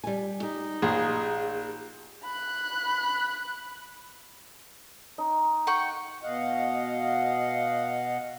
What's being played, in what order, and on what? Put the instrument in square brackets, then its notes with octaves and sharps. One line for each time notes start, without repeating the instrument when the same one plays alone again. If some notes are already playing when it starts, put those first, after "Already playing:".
[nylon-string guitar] G3 G#5
[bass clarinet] D#4 [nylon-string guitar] G4
[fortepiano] A#1 [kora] G#4
[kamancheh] B5 F#6
[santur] D#4
[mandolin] F#5 G5 C#6
[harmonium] B2 D#5 F5 F#5